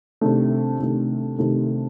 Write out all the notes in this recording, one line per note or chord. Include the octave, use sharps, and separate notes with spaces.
C3 D#3 A3 D4
C3 D#3 A3
C3 D#3 A3